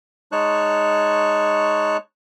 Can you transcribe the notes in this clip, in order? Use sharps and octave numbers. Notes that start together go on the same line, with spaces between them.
G#3 D#4 C#5 A5 C#6 F#6